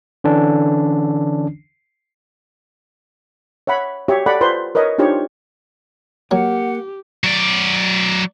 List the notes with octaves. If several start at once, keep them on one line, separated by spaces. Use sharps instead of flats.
D3 E3 C#4 D4
C#5 E5 F#5 B5
F#4 G4 C#5 E5
A4 D5 F#5 B5
F4 B4 C5 C6
A#4 B4 C#5 D#5
D4 D#4 F4 G4 C5 C#5
F#3 A#3 G4 F#5
F#3 D5